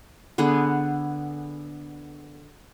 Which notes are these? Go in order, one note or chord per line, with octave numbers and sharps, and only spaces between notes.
D3 B3 G#4 F#5